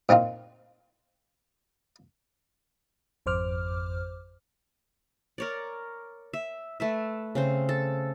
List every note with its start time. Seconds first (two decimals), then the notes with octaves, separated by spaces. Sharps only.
0.09 A#2 C4 D#4 F4
3.26 G#1 F2 C5 D6 F6
5.38 A#4 C#5 D5
6.34 E5
6.80 A3 B4 E5
7.35 C#3 C4 C5
7.69 A4